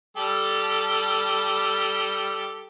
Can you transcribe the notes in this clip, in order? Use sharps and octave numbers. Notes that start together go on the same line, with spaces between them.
G3 G4 A4